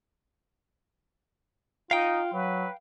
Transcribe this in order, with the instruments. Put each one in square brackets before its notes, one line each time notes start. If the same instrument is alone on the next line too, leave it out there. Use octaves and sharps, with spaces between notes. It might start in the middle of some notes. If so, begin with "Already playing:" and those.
[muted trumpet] D#4 [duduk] F4 [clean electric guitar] F5 G5
[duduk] F#3 [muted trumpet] B4